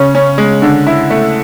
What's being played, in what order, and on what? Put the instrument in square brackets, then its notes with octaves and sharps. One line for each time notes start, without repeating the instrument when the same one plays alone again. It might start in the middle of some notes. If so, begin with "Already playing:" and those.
Already playing: [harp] C#3 [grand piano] C#4
[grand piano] C#4
G#3
D3
E4
A3